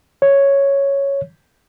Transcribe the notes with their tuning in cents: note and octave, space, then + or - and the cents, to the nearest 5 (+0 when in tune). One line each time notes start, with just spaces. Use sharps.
C#5 +0